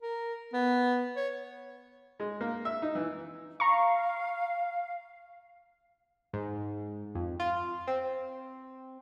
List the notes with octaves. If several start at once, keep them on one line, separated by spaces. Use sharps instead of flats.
A#4
B3
C#5
G#3
A#3
E5
D#4
E3
F5 A#5 C#6
G#2
F2
F4
C4